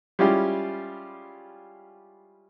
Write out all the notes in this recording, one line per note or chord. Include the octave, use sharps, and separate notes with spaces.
G3 G#3 C#4 E4 F4 G4